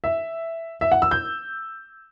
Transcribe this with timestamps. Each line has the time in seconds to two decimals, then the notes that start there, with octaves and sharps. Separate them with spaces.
0.04 E5
0.81 E5
0.92 F#5
1.02 E6
1.11 G6